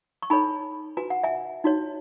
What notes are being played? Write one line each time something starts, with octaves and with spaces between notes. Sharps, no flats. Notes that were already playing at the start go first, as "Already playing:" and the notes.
C#6
D#4 A4 C#5 G#5 B5
F#4 B4 G#5
F#5
E5 G#5
D#4 F#4 C#5